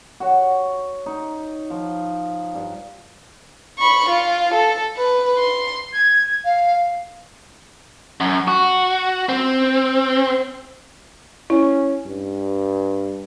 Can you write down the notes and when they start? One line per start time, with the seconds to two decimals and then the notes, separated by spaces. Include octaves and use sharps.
0.20 F#4 C#5
1.06 D#4
1.70 F3
2.55 G2
3.79 B5 C#6
4.10 F4
4.54 A4
4.97 B4
5.38 C6
5.93 G#6
6.45 F5
8.20 F#2
8.48 F#4
9.29 C4
11.50 C#4 E4
12.06 G2